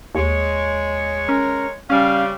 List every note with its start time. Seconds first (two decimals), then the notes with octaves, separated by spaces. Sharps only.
0.15 D#2 G#3 C#5
1.29 C#4 A#4
1.90 C#3 G3 C#4 F5